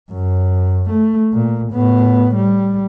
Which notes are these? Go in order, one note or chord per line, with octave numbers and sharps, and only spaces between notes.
F#2
A3
A#2
A2 B3
G3